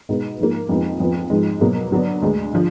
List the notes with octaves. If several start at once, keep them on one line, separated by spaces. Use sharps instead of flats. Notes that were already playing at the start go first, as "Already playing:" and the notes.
B2 G#3 B3 D#4
G#2 F3 A#3
F2 F3 G#3 B3 D#4
F2 F3 B3
G#2 F3 G#3
B2 F#3 A#3
D3 F#3 B3 D4
D2 D3 G#3
D3 F3